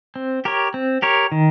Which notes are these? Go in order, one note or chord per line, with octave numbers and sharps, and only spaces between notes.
C4
G4 A#4 C#5
C4
G4 A#4 C#5
D#3